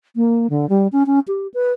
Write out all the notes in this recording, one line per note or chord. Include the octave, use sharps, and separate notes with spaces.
A#3
D3
G3
C#4
C#4
G4
B4